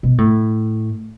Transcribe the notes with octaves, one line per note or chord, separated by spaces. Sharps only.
B2
A2